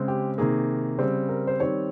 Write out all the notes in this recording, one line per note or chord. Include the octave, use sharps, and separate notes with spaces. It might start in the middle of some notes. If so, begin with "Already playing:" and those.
Already playing: C#3 G#3 C4
G4
C3 D#3 A#3 G#4
C#3 G3 C4
A#4
C5
D#3 G3 C4 C#5